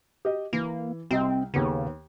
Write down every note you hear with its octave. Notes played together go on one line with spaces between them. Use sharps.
G4 D#5
E3 A#3
C2 C4 D#5 G5
D#2 C#3 B3